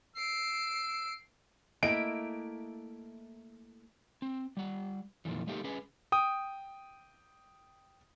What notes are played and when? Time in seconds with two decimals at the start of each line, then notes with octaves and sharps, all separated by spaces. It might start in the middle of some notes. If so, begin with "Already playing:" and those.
0.16 E6 C7 D7
1.83 A3 A#3 E4 D#5 D7
4.22 C4
4.57 G3 F#5
5.25 F2 A#2 D#3 E3
5.47 G3 A3 A#3 D#4 G4
5.64 C#4 G#4 B4
6.12 G5 D#6